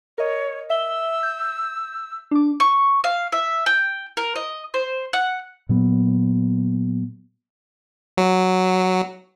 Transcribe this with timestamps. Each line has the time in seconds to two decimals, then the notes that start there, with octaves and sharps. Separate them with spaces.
0.18 A#4 C#5 D#5
0.70 E5 E6 G7
1.23 G6
2.31 D4 D6
2.60 C#6
3.04 F5
3.32 E5
3.66 G5
4.17 A#4
4.36 D#5
4.74 C5
5.13 F#5
5.69 A#2 F#3 B3
8.18 F#3